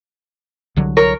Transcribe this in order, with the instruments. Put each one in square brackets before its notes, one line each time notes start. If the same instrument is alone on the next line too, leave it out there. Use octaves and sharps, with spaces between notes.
[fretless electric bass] C2 D3 F#3
[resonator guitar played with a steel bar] A#4 C#5